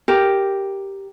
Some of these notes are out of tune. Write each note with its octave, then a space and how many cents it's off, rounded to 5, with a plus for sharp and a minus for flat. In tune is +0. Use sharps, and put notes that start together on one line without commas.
G4 +0 A#4 +0